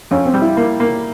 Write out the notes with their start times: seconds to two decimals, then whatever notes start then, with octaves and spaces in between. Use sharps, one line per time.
0.11 F2 C#4
0.25 C4
0.34 G3
0.42 E4
0.57 A#3
0.80 A#3